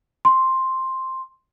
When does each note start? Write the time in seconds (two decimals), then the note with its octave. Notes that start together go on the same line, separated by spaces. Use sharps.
0.25 C6